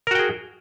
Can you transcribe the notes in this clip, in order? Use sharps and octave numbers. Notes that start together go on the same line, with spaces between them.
F#4 G#4 A#4 G5